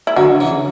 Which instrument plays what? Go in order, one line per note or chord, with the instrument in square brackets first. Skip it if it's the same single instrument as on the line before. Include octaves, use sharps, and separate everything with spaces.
[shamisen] E4
[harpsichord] D3 [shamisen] F#3 F#4
[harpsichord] C#3 E3